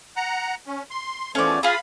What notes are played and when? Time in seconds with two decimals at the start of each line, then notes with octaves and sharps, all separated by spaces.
0.16 F#5 A#5
0.67 C#4
0.90 C6
1.35 E2 F3 A3 C#4 D5
1.63 F4 G#4 F5 B5